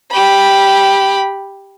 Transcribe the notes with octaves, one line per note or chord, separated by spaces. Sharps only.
G4 B5